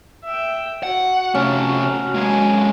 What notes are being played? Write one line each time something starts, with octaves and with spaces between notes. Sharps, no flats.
E5 G5
F#4 F#5
C3 A3 C#4
F#4 A#5
G#3 A#3 G#5